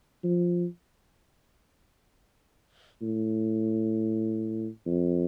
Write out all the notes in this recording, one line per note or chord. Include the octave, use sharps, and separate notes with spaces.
F3
A2
F2